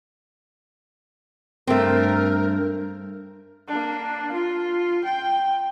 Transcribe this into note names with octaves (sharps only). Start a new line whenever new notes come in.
G2 A3 C4 A#4
A#3 D4
F4
G5